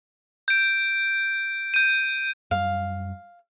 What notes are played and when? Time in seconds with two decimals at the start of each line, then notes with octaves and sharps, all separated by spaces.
0.48 G6 D7
1.74 G6 D#7
2.51 F#2 G3 F5